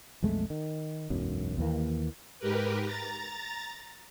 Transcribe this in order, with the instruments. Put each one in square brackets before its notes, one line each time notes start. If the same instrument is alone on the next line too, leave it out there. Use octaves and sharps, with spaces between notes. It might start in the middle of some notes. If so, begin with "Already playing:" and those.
[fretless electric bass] B1 F2 G#3 A3
D#3
E1 B1 F#2
D#2 E3 A#3
[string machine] G#2 G4 A#4 B4
A#5 A6